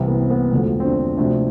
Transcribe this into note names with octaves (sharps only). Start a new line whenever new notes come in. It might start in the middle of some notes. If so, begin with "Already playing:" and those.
Already playing: C2 C3 E3 C4
B3
C4
B3
E1 D2 D3 F3
C4
D4
D2 C3 F3 D4